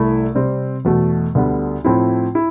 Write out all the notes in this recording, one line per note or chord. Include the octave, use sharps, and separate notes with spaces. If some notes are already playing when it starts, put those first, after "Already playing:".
Already playing: C2 A3 E4
C3 G3 C4
E2 B2 A3
D2 D3 G3 B3
A2 F3 C4 E4
E4